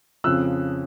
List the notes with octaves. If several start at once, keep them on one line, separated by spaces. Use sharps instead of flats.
F2 C#3 F3 E6 F#6